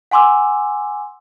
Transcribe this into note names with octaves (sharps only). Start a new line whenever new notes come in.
F#5 G#5 C6 D6 E6